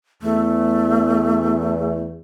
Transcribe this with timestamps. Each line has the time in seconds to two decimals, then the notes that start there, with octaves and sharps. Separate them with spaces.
0.22 E2 A3